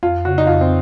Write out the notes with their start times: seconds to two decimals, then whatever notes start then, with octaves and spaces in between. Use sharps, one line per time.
0.03 F2 F4
0.25 C#3 F#4
0.38 D#4
0.47 F2 F4
0.61 C4